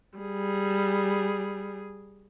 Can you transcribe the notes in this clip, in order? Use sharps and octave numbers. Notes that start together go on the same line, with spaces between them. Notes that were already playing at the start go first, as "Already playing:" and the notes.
G3 G#4